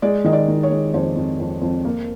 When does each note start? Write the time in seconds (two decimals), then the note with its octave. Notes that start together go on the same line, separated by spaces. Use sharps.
0.02 G#3 D5
0.24 D#3 D#5
0.33 D5
0.48 D#3
0.63 C#5
0.71 G#3
0.93 F2 C5
1.16 F2
1.40 F2
1.61 F2
1.85 A#3